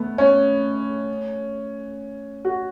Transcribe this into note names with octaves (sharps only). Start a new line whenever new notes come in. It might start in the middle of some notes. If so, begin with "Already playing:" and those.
Already playing: A3 B3
C#4
F#4